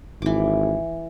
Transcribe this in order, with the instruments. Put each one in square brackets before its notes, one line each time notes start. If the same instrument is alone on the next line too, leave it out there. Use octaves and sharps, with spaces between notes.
[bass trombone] G#1 [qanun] E3 D6